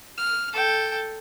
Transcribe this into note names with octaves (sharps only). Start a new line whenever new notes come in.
F6
A4 G5